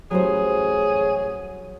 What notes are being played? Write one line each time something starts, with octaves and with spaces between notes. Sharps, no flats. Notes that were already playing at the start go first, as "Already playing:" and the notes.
A1 F#3 G3 G#4 C5 C#5